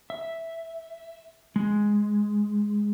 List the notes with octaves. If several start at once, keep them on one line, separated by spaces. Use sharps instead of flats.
E5
G#3